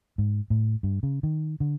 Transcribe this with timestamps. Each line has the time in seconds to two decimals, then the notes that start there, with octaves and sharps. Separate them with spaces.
0.18 G#2
0.50 A2
0.83 G2
1.03 C#3
1.23 D#3
1.60 D3